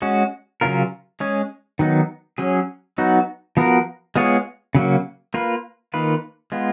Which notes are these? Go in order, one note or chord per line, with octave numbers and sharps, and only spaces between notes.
G#3 C#4 F#4
C#3 F#3 C#4 F4 A#4
G#3 C#4 G#4 C#5
D#3 F#3 B3 D#4
F#3 C#4 G#4
F#3 B3 D#4 F#4
F3 B3 F#4 A#4
G#3 B3 F4 G#4 C#5
C#3 F#3 A#3
A#3 F4 B4
D#3 A#3 F4 B4
G#3 B3 F4